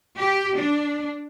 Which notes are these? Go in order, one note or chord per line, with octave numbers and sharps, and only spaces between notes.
G4
D4